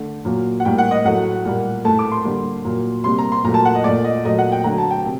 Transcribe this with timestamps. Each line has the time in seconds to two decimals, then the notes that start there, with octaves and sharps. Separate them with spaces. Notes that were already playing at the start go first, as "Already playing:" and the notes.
Already playing: D3 A3
0.25 A#2 F#3 A#3
0.60 F#5
0.65 A2 G3 A#3 G5
0.78 F#5
0.91 D#5
1.04 A2 F#3 A3 F#5
1.45 A#2 G3 A#3
1.84 A2 A3 A5
1.99 D6
2.11 C6
2.24 D3 G3 A#3
2.65 A#2 F#3 A#3
3.04 C3 G3 A#3 C6
3.18 A#5
3.32 C6
3.44 A#2 F#3 A3 A#5
3.54 A5
3.65 F#5
3.75 D#5
3.84 A#2 A3 D5
4.04 D#5
4.25 A#2 F#3 A3 D#5
4.39 F#5
4.52 G5
4.64 D3 F#3 A3 A#5
4.78 A5
4.91 G5
5.05 C3